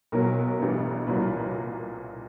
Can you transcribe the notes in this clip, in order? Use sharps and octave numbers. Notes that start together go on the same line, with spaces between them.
B1 B2 F#3 A#4
A1 G2 E3 G3 B3
C2 A#2 F#3 A#3 B4